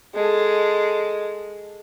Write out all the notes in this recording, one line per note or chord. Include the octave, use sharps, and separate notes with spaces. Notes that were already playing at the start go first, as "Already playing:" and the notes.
G#3 A4